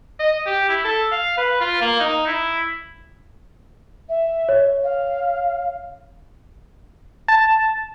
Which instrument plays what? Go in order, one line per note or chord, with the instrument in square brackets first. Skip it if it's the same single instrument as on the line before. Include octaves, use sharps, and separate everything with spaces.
[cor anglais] D#5
G4
E4
A4
F5
B4
F4
A#3
D#4
E4
[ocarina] E5
[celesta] C#5
[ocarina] F5
[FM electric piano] A5